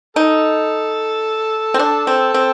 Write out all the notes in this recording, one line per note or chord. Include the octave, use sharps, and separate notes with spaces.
D#4 A4
C4
D4
C4
C4